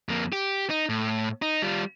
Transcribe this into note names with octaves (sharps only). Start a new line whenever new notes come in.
F2 A#3
G4
D#4
A2
D#4
G3 F4